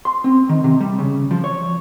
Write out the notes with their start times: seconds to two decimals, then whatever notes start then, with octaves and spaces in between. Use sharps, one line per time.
0.05 C6
0.24 C4
0.49 D#3
0.64 C3
0.80 G3
0.99 C#3
1.31 F3
1.44 C#5